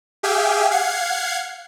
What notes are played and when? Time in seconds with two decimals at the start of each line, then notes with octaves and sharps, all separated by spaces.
0.23 G4 G#4 E5 F5 G5 G#5
0.71 F5 F#5 G#6 C7